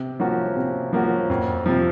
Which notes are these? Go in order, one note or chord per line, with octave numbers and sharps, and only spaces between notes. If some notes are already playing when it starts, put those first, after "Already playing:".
Already playing: C3
F3 A#3 C#4 F#4
C3
F3 A#3 C#4 F#4
F2
C3 F3